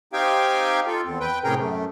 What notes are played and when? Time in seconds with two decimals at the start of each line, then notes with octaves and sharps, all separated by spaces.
0.13 C4 D#4 G4 F5 G5 G#5
0.87 F4 A4
1.05 E2 C4
1.20 B4 G5
1.44 A2 C3 C#4 G#4 A#4 G5
1.58 F#2 A3